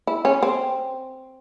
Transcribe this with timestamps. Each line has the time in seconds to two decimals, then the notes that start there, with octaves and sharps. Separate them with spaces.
0.07 E4
0.25 C#4
0.43 C4